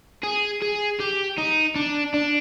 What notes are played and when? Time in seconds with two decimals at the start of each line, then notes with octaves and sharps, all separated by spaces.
0.23 G#4
0.62 G#4
1.00 G4
1.38 D#4
1.76 D4
2.14 D4